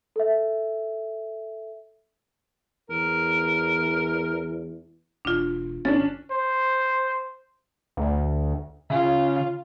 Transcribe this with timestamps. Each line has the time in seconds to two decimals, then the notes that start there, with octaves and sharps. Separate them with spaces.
0.16 A4 E5
2.90 E2 A#4
5.25 E1 D4 F4
5.85 G1 C#4 D4 A6
6.31 C5
7.97 D2
8.90 C#3 F4